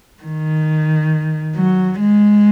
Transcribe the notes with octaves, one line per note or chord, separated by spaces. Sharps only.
D#3
F#3
G#3